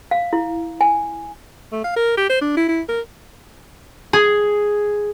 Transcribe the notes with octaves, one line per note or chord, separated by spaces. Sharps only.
F5
E4
G#5
A3
F5
A#4
G4
C5
D4
E4
E4
A#4
G#4